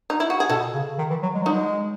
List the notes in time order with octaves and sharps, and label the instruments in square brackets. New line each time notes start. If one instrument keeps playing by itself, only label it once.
[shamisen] D#4
E4
F#4
G#4
[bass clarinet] B2 [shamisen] F#4 A4
[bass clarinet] C#3
D#3
E3
F#3
G#3
F#3
[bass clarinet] G#3 [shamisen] D#4 F#4